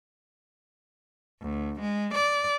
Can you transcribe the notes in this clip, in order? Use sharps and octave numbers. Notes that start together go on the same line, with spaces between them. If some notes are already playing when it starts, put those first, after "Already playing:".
D2
G#3
D5